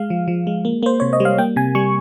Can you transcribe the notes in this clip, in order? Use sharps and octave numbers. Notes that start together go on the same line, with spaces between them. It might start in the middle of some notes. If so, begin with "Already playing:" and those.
Already playing: G#3 F5
F3
F3
G#3
A#3
A#3 C5
C3 C#5
D#5
G3
F5
A#3 G5
C3 G#5
G3 C#6